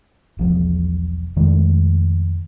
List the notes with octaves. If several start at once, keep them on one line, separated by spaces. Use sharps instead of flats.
E1 B1 E2 F3
F2 D#3 G#3 A3